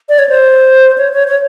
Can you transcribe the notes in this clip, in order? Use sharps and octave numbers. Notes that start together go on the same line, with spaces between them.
D5
C#5
C5
C#5
C#5
C#5